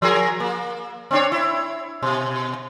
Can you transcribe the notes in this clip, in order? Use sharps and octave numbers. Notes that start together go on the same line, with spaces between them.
F3 G#4 A#4
A#3
C4 D4 C#5
E4
B2